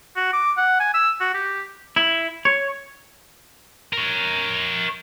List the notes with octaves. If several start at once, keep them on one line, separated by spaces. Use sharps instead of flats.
F#4
D6
F#5
G#5
E6
F#4
G4
E4
C#5
A#4 C#5